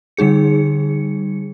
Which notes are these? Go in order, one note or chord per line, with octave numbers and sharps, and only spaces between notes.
D3 G3 D#4 G#4 C#7